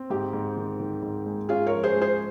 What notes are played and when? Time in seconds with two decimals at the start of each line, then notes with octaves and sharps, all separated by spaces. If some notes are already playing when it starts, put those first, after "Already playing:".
Already playing: C4
0.10 G#2 G4
0.33 G#2
0.57 D#3
0.79 D#3
1.03 G#2
1.26 G#3
1.49 C#4 F4 G#4
1.67 A#4 C#5
1.72 F3
1.83 G#4 C5
1.95 G#3
2.01 G#4 C5